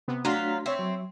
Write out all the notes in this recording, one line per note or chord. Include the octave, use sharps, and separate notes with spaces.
C3 B3
F#3 A3 D4 F4 F#4 A#5 C6 B6
C4 C#5 E5
F#3